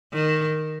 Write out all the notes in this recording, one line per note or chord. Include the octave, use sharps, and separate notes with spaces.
D#3